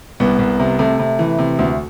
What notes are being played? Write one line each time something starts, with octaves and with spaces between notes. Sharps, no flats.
C2 B3
C2
C3
C3 A3
C3
E3
C3
D2